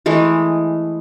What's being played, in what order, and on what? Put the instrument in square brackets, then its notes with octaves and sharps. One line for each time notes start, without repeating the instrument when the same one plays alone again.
[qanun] E3 G#3 A3